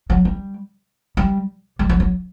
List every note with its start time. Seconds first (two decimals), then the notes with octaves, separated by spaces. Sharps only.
0.10 F#3
0.25 G3
1.17 G3
1.79 G3
1.89 F#3
2.00 F#3